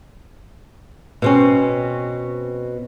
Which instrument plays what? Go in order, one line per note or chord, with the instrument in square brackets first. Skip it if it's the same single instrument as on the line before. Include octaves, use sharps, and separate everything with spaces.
[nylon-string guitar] B2 C4 C#4